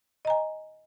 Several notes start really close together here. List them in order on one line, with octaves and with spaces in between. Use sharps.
D#5 A#5 G#5